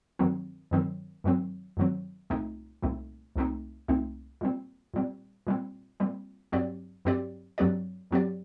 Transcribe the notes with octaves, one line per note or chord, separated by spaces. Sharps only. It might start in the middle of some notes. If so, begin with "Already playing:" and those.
G2 D#3 F#3 C4
G2 D#3 F#3 C4
G2 D#3 F#3 C4
G2 D#3 F#3 C4
C2 A#2 A3 C4 D#4
C2 A#2 A3 C4 D#4
C2 A#2 A3 C4 D#4
C2 A#2 A3 C4 D#4
A#2 G3 C4
A#2 G3 C4
A#2 G3 C4
A#2 G3 C4
G2 F#3 C4 G4 D5
G2 F#3 C4 G4 D5
G2 F#3 C4 G4 D5
G2 F#3 C4 G4 D5